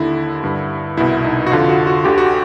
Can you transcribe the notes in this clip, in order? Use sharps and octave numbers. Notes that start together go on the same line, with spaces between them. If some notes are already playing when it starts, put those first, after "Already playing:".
Already playing: D#2 D3 E4
G2 D3
C2 B2 E4
D#4
F#4
F2 D3 F4
F#4
F#4
D2 D3 G4
F#4